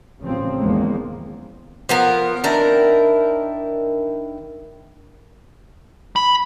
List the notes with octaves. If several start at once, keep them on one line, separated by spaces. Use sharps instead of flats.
A1 C#3 F3 C4
E2 D#3 F3 G#3 A#3
F3 B3 A#4
D#3 D4 E4 A#4
B5